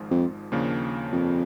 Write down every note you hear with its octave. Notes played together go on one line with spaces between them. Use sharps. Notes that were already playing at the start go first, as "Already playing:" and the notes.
Already playing: G#1 G#2 F3 G#3
F2
D#2 C#3 F3 A#3 D4
F2